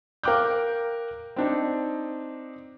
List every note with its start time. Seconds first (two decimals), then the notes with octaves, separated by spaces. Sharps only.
0.23 A#4 F5 G5 D6 F#6 G6
1.36 C4 D4 D#4